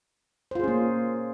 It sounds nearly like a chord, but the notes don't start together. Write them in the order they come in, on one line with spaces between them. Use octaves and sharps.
C5 F4 G#4 C#4 A#3